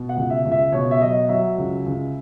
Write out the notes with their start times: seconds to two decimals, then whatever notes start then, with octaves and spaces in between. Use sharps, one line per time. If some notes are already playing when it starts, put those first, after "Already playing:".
Already playing: B2
0.09 F#5
0.16 C#2
0.30 E5
0.45 C#2
0.52 E5
0.72 B2 C#5
0.91 E5
1.01 F#3 D#5
1.29 F#3 E5
1.58 C#2
1.86 C#2